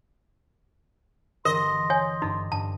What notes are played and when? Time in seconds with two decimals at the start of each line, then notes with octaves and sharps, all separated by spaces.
1.45 G1 E3 A#4 D#5 C6
1.90 C#5 G#5
2.22 G2 D#4 G4 D#6
2.52 G2 A5